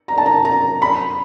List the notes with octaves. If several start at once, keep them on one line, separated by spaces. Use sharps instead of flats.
A#5
A5
A#5
A#5
B5